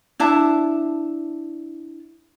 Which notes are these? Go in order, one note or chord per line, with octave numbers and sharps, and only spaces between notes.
D4 E4 E5 A5